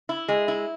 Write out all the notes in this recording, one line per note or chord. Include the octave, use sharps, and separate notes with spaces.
E4
G#3
E4